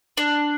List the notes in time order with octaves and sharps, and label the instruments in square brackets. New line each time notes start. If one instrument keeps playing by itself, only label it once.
[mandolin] D4